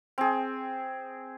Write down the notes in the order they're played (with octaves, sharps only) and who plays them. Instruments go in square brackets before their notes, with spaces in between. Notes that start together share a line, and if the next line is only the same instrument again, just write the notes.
[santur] C4 G#4